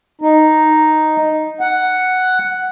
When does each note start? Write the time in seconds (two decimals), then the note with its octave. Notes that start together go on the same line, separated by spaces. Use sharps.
0.22 D#4
1.61 F#5